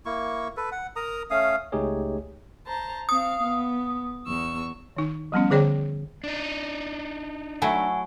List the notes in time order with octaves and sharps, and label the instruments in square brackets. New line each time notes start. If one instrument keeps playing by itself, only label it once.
[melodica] A#3 E4 C#6
A4 B4
F#5
A#4 A#5 D#6
A3 C#4 F5 D#6
[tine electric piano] C#2 A3 D#4 G4 G#4 C#5
[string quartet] C5 A5 A#5
[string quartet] C4 F5 [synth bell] D#6
[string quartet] B3
E2 C#6 E6
[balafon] D#3 D#4
F3 G3 B3 C#4
D3 G#4 C5 D5 G5
[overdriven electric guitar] D4 D#4
[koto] F#3 A3 E4 [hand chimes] F#5 G#5 C#6